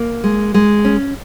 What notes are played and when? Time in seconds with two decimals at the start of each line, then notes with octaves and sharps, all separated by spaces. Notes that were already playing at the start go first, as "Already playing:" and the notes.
Already playing: A#3
0.24 G#3
0.54 G#3
0.85 C#4